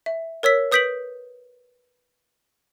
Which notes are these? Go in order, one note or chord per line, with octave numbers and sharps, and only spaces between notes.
E5
A#4 C#5 E6 B6
B4 D#6 G6 B6 D7 F#7